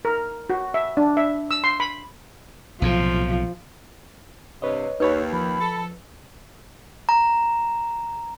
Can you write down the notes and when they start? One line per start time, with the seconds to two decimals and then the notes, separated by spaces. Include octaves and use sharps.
0.05 A#4
0.50 F#4
0.74 E5
0.97 D4
1.17 E5
1.51 E6
1.64 C6
1.80 B5
2.82 B1 A2 C3 F3 F4
4.62 G2 C3 B4 C#5 D#5
5.00 D#2 D#4 B4 C#5 B5
5.33 F3 B5
5.60 A4
7.09 A#5